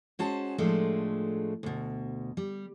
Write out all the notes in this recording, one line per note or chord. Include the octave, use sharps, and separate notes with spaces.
G#3 C#4 F#4 C5 A5
A2 F3 G#3 A3 D4
D2 B2
G3